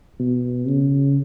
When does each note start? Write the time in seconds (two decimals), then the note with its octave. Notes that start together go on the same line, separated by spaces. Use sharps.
0.20 B2
0.68 C#3